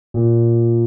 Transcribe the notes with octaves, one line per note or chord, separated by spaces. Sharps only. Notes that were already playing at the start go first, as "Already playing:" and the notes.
A#2